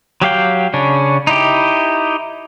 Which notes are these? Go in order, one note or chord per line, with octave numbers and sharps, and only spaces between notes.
F#3 G4 F5 G5
C#3 C#4 D4
D#4 E4 G4